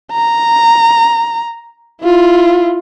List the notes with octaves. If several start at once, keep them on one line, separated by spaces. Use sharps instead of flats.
A#5
E4 F4